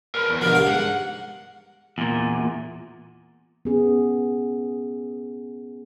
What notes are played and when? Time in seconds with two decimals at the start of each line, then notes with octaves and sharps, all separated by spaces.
0.15 A#4 B4
0.29 E2
0.42 B2 D3 F3 A#4
0.55 C2 F5
0.68 G#2 F#5
1.98 E2 A#2
3.65 B3 C#4 G#4